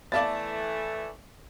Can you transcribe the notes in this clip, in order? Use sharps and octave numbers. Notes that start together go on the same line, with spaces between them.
E3 A3 B3 D5 E5 F5 A5 A6